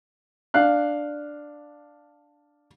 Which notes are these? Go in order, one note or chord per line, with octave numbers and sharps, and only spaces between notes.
D4 F5 F#6